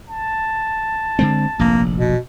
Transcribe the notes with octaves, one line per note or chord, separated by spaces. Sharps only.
A5
D3 G#3 C4
F1 A#1 A#3
B2